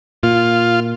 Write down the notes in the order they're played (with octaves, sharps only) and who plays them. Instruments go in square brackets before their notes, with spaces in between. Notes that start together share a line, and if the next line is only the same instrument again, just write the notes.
[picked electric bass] A#2 [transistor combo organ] F4